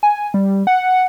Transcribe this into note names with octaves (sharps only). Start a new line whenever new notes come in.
G#5
G3
F#5